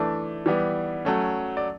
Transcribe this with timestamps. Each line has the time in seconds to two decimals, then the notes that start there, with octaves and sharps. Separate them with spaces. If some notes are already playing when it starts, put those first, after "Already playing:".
Already playing: E3 A3 D4 D5
0.46 E3 G3 B3
1.05 F#3 A3 C#4
1.57 D5